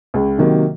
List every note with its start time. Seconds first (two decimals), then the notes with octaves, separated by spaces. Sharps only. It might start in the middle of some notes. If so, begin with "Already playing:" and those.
0.14 C#2
0.38 C3 D#3 F#3 A#3